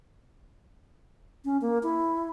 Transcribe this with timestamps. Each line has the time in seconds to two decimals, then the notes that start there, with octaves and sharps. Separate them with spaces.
1.45 C#4
1.61 A#3
1.83 E4